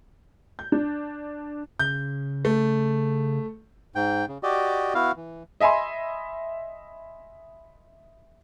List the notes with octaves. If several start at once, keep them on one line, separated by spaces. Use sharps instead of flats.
G6
D4
C#3 G6
A3
G#2 G5
C#3
F#4 G4 D5 D#5
B3 E4 F#4 F5
E3
D#5 E5 G#5 B5 C6